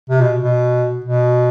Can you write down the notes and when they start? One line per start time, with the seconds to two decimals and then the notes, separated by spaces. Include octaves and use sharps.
0.09 C3
0.21 B2
0.43 B2
1.04 B2